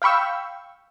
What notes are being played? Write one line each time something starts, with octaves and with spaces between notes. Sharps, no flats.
F5 G5 B5 C#6 E6